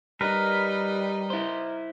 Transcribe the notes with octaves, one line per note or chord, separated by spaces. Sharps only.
G3 D#4 A#4 B4
E4 C5